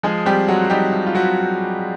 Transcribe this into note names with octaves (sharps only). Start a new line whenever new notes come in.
F3 G#3 G#4
G3 C4 G4
F#3 G#3 F#4
F#4
G3 D#4 G4
F3
F4
F#3 C4 F#4